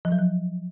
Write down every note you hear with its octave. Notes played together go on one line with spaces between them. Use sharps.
F3
F#3
F3